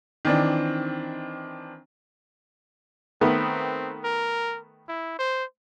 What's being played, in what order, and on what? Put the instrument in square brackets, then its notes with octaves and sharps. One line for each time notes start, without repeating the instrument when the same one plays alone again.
[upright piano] D#3 E3 C4 D4
[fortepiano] D#3 A3 B3 [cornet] C4
[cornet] A#4
E4
C5